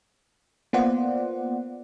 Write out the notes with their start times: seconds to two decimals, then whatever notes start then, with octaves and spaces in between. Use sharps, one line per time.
0.73 A#3 B3 F4 C5 D5 F#5